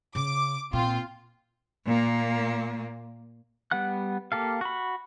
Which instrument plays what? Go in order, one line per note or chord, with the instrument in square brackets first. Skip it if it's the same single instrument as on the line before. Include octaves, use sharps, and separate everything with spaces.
[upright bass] C#3 [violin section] D6
[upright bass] A#2 [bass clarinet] C4 [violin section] F4
[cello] A#2 A#3
[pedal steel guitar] G3 B3 F#5 F#6
A#3 G4 A4 F5
F#4 B5